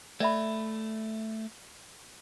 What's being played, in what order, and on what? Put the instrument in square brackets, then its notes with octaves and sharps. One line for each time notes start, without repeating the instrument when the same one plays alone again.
[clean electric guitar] A3 [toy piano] D5 E5 B5